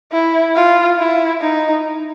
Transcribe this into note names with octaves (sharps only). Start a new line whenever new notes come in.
E4
F4
E4
D#4